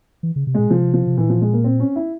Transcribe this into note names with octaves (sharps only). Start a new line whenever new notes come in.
E3
C#3
C3
A#2 G#3
C3 F3
F3
C3
A#2 E3
F3
G#3
A#3
C4
C#4
E4